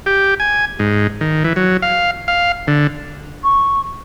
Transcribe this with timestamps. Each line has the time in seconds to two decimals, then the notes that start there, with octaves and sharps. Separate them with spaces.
0.06 G4
0.40 G#5
0.79 G#2
1.21 D#3
1.44 E3
1.56 F#3
1.82 F5
2.28 F5
2.68 D3
3.44 C#6